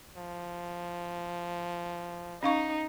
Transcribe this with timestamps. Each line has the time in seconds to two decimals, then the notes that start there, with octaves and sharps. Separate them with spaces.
0.17 F3
2.43 C#4 D#4 F5 C#6